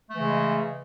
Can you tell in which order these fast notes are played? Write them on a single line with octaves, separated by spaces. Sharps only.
A3 E3 C#3 G#3